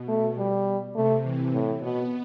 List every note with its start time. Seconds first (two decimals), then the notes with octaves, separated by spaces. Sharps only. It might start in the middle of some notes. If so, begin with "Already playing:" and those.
Already playing: B2
0.08 A3
0.37 G3
0.95 C3 A3
1.24 E3
1.53 A2
1.81 B2 B3